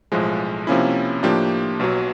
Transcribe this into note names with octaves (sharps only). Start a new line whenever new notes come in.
B1 A2 F3 G#3
C3 F3 A#3 C#4 E4
A2 F3 A#3 D4 G4
B1 B2 F#3